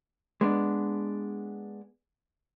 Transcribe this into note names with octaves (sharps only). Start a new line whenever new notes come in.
G#3 B3 D4